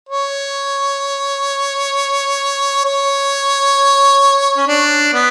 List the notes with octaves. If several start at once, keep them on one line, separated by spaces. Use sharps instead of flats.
C#5
C#5
C#4
D4
B3